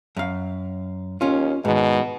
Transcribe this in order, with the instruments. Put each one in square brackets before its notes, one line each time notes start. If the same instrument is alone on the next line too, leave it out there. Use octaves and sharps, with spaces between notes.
[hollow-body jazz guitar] F#2 F5
[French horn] D#2 [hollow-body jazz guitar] C#4 F4
[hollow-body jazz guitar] G#2 D#3 [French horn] B2